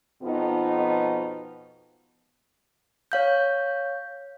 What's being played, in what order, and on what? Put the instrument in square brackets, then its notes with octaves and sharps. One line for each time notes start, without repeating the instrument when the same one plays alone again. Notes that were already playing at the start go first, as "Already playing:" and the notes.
[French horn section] F2 B2 F3 B3 D#4
[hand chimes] C#5 F5 G6